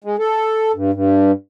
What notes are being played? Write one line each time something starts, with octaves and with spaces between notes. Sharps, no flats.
G#3
A4
G2
G2